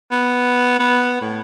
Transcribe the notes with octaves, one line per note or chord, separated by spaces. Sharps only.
B3
B3
A2